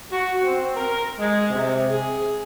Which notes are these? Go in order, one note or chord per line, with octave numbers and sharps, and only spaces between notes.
F#4
C4
A#4
G#3
C3
G#4